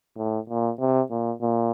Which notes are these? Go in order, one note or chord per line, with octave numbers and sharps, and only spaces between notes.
A2
A#2
C3
A#2
A#2